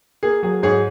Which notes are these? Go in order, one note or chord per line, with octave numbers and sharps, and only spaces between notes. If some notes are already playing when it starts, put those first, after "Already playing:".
A#3 G#4
F#3 G#4
G#2 G#4 C#5